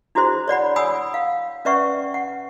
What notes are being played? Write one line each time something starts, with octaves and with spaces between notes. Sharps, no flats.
D4 E4 F#4 G#4 C5 C6
C#5 D5 F#5 B5
F#5 G#5 B5 D#6 E6
F5
C#4 B4 D5 E5 F#5 C#6
F#5